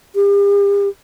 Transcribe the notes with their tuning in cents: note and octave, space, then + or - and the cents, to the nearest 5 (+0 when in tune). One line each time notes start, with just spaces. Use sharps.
G4 +40